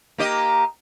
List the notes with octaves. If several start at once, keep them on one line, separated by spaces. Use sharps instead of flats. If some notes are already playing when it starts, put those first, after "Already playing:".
A#3 G4 D#5